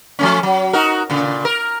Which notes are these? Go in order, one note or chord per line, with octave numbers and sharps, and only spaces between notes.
F3 A3 C#4
F#3
D#4 F#4 A#4
A#2 C#3
A#4